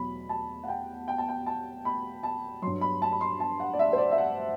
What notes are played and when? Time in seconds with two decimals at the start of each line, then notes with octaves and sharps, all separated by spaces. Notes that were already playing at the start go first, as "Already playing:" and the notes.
Already playing: E2 B2 F#3 B5
0.29 A5
0.63 F#5
0.68 G5
1.08 G5
1.18 A5
1.29 G5
1.46 A5
1.85 B5
2.23 A5
2.62 F#3 C6
2.67 G2
2.81 B5
3.02 A5
3.12 B5
3.21 C6
3.40 A5
3.60 F#5
3.73 D5
3.79 E5
3.93 C5
3.98 D5
4.12 E5
4.18 F#5